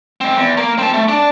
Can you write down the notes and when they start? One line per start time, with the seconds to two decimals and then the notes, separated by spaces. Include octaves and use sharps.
0.21 G#3 C4
0.37 E2
0.57 A#3
0.78 C4 A5
0.94 A3
1.08 D4